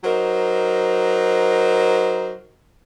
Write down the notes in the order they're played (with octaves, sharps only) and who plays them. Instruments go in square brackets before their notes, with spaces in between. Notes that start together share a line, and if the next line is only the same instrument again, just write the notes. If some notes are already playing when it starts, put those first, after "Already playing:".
[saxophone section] F#3 D#4 A#4 C5